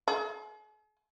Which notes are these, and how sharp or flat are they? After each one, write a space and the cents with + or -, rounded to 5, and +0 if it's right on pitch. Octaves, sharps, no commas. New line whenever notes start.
G#4 +45